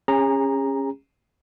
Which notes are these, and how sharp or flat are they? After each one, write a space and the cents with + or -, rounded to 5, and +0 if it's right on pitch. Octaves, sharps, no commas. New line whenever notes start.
C#4 -15 G#4 -35 A#5 +0